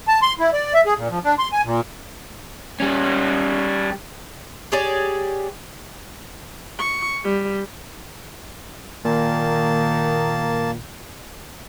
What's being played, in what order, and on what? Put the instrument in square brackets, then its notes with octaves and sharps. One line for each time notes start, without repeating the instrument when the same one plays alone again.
[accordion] A5
C6
E4
D5
E5
G#4
A#2
F3
D4
C6
G#5
A#2
[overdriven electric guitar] G3 C#4
[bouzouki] G4 G#4 C#5 D5
[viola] C#6
G3
[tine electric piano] A#2 [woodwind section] D#3 [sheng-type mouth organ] A#3 A5